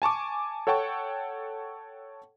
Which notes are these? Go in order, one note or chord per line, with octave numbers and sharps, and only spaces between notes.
G#5 A5 C#6 D6
A4 C#5 F#5 G5 A5 C#6